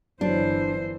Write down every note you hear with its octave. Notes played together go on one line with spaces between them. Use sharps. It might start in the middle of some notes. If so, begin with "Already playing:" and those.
G1 E3 F#3 D4 C5